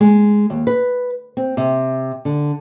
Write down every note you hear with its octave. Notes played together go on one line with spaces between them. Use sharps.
G#3
D#2
B4
C4
C3
D3